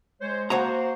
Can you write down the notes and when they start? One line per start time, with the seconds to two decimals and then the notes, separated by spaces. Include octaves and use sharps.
0.22 G#3 C5 C#5
0.50 A#3 F#4 C5 C#5 F#5 A#5